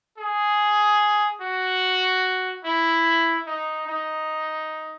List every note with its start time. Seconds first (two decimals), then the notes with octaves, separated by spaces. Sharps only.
0.18 G#4
1.41 F#4
2.64 E4
3.47 D#4
3.88 D#4